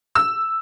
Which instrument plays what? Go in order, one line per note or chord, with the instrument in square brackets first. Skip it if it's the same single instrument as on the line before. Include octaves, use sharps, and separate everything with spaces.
[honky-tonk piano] E6